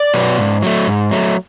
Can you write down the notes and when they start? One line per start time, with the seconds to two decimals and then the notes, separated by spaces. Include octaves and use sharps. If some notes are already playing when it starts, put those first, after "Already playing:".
Already playing: D5
0.14 B2 F#3 B3
0.38 G#2
0.63 F#3 A3
0.87 G#2
1.11 F#3 A3